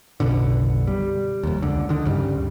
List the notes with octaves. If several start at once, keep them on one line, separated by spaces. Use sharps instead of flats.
F#1 B1 B2 D3
G3
F1 D#2
C#2 D3
D3 D#3
D2 G2 C#3 G3